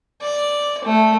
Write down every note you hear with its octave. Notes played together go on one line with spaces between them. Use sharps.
D5
A3